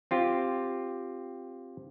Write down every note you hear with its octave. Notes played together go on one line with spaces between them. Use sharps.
C4 F4 G4